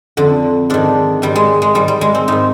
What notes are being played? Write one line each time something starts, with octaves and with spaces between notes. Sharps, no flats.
F2 D3
G#2 D#3 D4
G#2 D#3 G3
G#3
G#3
G#2 D#3 G3
G3
G#3
C4
G#2 D#3 D#4